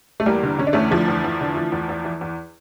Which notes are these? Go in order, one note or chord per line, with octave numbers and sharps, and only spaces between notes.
A3
E2 G3 A#3
D3
D3 C#4
D4
E2 A3 C#4
D3 F3 A3
E2
E2
D3
E3
E2
E2
E3
E2